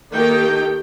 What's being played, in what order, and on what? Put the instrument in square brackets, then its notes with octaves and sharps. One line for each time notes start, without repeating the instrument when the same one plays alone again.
[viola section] D#3 A#3 D#4 G4 A4 G5